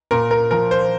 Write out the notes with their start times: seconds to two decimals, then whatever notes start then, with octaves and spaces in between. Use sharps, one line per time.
0.11 A#2 A#4
0.31 A#4
0.51 F3 A#4
0.71 C5